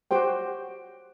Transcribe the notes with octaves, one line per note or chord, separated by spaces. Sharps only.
F#4 G4 C5 G5